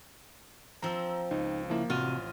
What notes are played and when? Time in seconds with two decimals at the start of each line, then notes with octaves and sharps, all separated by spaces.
0.82 F3 C4 A#5 E6
1.31 C#2 D#4
1.70 C#3 F3 A#3 E4
1.90 A1 C3 F4 F#4 D#7